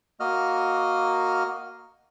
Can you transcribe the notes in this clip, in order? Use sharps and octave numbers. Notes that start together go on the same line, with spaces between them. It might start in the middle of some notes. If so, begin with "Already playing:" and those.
A#3 F#4 D#5 F6